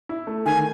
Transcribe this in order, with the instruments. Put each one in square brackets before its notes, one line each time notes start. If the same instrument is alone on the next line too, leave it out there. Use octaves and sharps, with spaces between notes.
[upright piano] E4
A3
[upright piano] D#3 [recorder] G#5